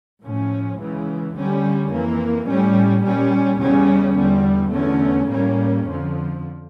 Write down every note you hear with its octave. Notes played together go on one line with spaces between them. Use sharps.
A2 F3 C#4
C#2 C#3 E3
D2 D3 G3 C#4
F2 E3 A#3
A2 G3 C#4
A#2 G3 C#4
E2 C#3 G3 C#4
E2 D3 G3
E2 D3 A3 C#4
A2 G3 A#3 C#4
F2 D3 F3